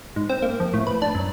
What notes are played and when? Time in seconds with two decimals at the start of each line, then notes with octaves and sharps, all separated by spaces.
0.16 G#2
0.29 C4
0.42 A#3
0.60 F2
0.74 A2
0.87 B4
1.02 D4
1.15 F#2